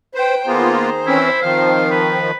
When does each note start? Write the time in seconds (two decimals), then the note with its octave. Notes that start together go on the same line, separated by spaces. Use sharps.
0.14 B4 C5 G5
0.47 D#3 A#3 B3 F4 G#4 C5 A#5
1.06 E3 C4 C#4 E4
1.42 D#3 F3 C4 A#4 F5
1.91 B4